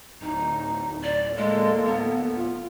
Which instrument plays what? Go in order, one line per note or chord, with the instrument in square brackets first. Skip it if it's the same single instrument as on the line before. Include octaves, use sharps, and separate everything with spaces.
[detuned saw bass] D1 [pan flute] D#4
[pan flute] D5
[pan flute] G#3 [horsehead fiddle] A#3 A4
[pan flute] B3
[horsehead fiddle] F4